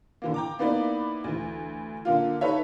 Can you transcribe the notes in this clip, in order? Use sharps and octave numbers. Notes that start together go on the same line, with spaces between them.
D3 E3 A#3
G5 A#5 D6
A#3 B3 D#4 E4 D5
D2 E3
D3 A#3 F4
D#4 A4 B4 C#5 E5